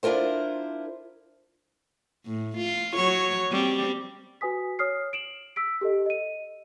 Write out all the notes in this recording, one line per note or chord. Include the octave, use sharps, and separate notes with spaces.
D4 E4 F4 A#4 C5
A2
F4
F#3 C#5
G3 C4
F#4 B4 G#5 D#6 B6
C#5 D#6 F6 C7
D7 E7 F#7
E6 B6 D7
G4 A4 D#5
D#5 D#7